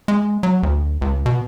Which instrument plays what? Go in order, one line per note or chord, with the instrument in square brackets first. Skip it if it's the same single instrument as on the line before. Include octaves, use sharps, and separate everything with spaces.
[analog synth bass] G#3
F#3
D2
C#2
B2